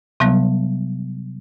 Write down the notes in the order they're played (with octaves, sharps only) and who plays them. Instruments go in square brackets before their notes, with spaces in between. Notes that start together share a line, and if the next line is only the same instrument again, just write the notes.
[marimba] C3 F#3 G3 B3